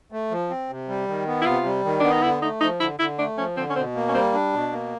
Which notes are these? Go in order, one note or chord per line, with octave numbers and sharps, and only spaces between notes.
A3
F3
C4
C3
G3
D#3
B3
E4
C3 F4
G3
D#3
B3 D4
D#4
D3 E4
A3 D#4
F3 D#4
D3 E4
D3 E4
A3 D4
F3 C#4
D3 C4
C#4
B2 C4
A#3
C#4
G3 C4
D4
B2
A#3